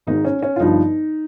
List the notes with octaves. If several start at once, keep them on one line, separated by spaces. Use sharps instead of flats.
G#1 G#2 D#3 G#3 D#4
C#4
C#4
F4
G1 G2 F3 D#4